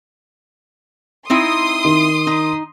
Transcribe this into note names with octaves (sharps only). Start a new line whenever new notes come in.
C4 D#4 E4 C6 D#6
D#3
D#4